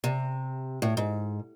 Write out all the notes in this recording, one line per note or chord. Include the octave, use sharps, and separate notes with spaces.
C3
A2
G#2